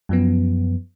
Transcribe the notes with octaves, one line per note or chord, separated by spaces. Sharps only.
F#2 F3 B3